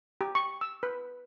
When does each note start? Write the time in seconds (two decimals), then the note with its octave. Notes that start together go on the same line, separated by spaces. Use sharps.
0.21 G4
0.35 C#6
0.61 E6
0.83 B4